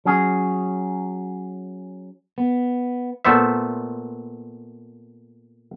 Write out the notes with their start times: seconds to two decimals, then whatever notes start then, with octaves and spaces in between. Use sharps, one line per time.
0.05 F#3 C#4 F#4 G#4
2.38 B3
3.25 A#2 A3 B3 C5 E5